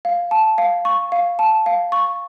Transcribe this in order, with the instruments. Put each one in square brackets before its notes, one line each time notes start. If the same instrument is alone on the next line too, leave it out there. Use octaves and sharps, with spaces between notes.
[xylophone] F5
A5
F5
C#6
F5
A5
F5
C#6